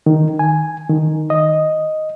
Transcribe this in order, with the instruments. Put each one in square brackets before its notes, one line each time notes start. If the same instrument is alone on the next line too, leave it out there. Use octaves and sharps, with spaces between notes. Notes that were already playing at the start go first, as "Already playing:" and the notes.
[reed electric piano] D#3
G#5
D#3
D#5